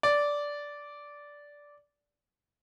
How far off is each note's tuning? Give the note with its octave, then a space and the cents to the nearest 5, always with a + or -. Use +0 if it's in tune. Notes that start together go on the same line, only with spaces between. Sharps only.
D5 -10